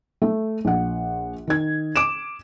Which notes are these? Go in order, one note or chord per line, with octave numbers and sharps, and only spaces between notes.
A3
A#1 F#5
D#3 G#6
D6 D7 E7